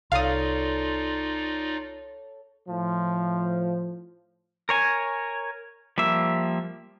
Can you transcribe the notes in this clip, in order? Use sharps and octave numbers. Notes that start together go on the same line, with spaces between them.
C2 D#4 F4 A4 C#5 D5 F5 D#6
A2 F3
A#4 C#5 G#5
F3 G3 A#3 E5